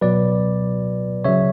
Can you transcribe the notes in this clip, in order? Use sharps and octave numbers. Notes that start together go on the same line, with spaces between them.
B2 F#3 B4 D5
C#3 F#3 C#5 E5